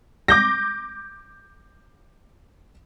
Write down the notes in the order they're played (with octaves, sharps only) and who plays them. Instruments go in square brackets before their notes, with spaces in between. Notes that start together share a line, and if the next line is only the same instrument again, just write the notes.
[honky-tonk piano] D6 G6 A#6